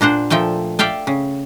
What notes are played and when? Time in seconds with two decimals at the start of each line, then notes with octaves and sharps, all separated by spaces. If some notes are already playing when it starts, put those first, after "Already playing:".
0.01 A#2 D4 C5 F#5
0.30 A#2 F3 A3 G5 A5
0.79 D5 E5 F5 G5 A5
1.07 C#3